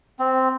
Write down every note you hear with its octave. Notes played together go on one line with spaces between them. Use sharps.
C4